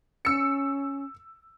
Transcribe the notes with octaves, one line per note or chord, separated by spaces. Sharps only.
C#4 E6 C#7